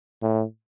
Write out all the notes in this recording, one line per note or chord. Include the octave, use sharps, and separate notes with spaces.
A2